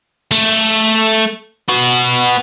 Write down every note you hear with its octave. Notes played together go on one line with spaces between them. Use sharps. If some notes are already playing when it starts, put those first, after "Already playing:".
A3
B3 F#4